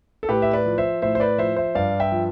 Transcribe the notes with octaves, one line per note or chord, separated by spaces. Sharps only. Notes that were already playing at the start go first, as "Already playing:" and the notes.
A4
A2 G4 B4
E5
B4 D5
F3
C5 E5
A2 C5 E5
C5
B4 D5
F3 C5 E5
C5 E5
G2 D5 F5
E5 G5
F3